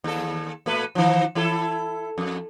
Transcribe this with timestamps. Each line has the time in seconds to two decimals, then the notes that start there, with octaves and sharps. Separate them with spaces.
0.04 D#2 A4
0.66 A#2 A3 B4
0.95 D#3 F3
1.35 E3 E4 A4
2.18 F2